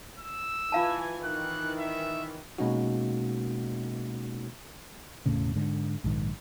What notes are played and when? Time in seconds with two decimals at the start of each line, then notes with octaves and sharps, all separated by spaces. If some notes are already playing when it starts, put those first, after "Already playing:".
0.19 E6
0.72 E3 F4 F5 G#5 A5
1.24 D#3 E3 F#6
1.79 E5
2.58 B2 G#3 A#3 C#4 D#4 F#4
5.26 E1 A2 C#3
5.56 G#2 D3
6.04 A#1 G#2 D#3